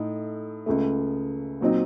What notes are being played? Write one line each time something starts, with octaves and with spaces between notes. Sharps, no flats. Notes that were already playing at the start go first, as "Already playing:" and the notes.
Already playing: A2 A3 D#4 A4
C#2 C#3 A3
A#2 F#3 C4 D#4